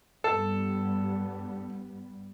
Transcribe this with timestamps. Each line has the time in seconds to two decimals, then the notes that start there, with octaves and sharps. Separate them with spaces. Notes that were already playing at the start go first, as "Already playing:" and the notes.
0.24 G2 G3 B3 A4